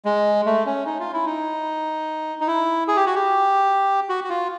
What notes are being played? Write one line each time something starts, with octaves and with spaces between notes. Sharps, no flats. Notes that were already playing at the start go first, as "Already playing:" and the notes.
G#3
A3
C#4
D#4
F4
E4
D#4
D#4
E4
G#4
G4
F#4
G4
F#4
F#4
F4